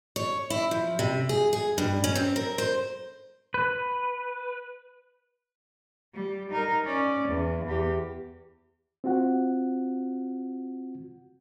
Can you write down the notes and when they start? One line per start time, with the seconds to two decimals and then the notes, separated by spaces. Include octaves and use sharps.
0.16 C#5
0.50 E4
0.71 F3
0.99 C3
1.29 G#4
1.53 G#4
1.78 G2
2.04 C#4
2.15 C4
2.36 A#4
2.58 C5
3.54 B4
6.14 G3
6.51 D#4 A#4
6.84 C#4 D5
7.28 E2
7.65 E2 G4
9.04 C4 F4 F#4 F#5